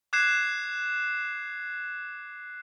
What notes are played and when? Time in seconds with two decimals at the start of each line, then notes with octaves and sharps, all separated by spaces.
0.13 D6 F#6 G#6 C7 E7